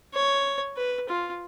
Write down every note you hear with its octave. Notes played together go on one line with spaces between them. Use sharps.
C#5
B4
F4